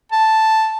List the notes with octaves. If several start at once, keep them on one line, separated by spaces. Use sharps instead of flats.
A5